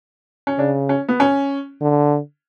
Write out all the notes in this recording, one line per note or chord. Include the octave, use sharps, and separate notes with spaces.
C#4
C#3 D4
C#4
B3
C#4
D3